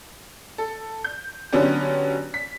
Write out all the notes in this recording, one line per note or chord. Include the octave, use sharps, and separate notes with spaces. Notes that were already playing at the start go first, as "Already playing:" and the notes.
A4
G6
D3 F#3 B3 C#4 D4 G4
B6